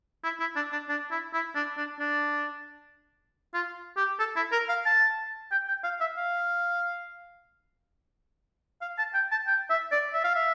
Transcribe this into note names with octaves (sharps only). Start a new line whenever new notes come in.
E4
E4
D4
D4
D4
E4
E4
D4
D4
D4
F4
G4
A4
E4
A#4
F5
A5
G5
G5
F5
E5
F5
F5
A5
G5
A5
G5
E5
D5
E5
F5
E5